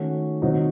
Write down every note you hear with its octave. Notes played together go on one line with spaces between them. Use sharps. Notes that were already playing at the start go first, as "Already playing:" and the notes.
Already playing: D#3 A3 C#4 F#4
D#3 F#3 C4 D#4 F#4